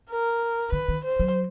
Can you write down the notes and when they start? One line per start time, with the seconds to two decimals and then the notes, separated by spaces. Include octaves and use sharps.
0.10 A#4
0.72 D3 B4
0.88 D#3
1.04 C5
1.20 F#3